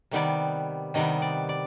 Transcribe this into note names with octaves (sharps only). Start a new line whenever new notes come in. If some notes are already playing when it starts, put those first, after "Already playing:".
C3 D#3 G3 B3 D5
C3 D#3 G3 B3 D#5
D5
D5